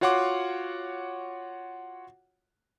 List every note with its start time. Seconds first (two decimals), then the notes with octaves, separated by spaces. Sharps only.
0.01 F4 F#4 C#5 F#5 C6 D6